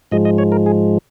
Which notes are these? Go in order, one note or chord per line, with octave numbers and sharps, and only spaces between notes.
G#2 F3 G#3 D#5
D#5
C#5
A#4
G#4